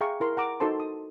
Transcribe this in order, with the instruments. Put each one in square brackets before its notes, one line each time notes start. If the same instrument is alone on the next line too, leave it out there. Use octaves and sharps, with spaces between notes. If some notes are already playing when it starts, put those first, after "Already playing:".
[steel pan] G#4 E5 F5 G5 A#5 C#6
E4 A#4 C6
F#5 A#5 D6
D#4 F#4 A4 C5 A5 C6
D#6